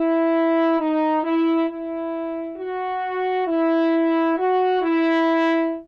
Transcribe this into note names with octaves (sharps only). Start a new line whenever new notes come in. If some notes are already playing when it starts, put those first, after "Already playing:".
Already playing: E4
D#4
E4
E4
F#4
E4
F#4
E4